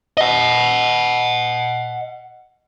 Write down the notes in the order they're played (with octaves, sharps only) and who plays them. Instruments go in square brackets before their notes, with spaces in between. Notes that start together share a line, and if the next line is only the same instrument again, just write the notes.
[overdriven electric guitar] D#5 F#5